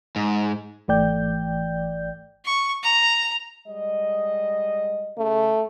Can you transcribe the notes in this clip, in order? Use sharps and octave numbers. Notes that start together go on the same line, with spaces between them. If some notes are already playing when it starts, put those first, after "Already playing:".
G#2
G#1 E3 A3 D5 G5 G6
C#6
A#5
G3 G#3 D#5
C#3 A3